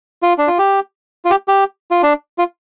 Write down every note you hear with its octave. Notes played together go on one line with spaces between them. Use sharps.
F4
D4
F4
G4
F4
G4
G4
F4
D4
F4